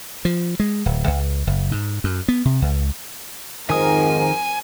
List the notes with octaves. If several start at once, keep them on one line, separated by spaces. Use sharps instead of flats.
F3
G#3
D1
C#2
F#1
G#2
F#2
B3
C3
C#2
F2 G#2 D#3 F3 C4 A#4 G#5 D#6